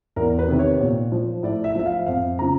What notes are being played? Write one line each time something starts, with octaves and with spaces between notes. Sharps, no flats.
E2 A#4
B4
C3 D#3
C#5
A#2
F3
A2 D5
E5
F3 E5
F5
F2 F5
C#3 F3 A#5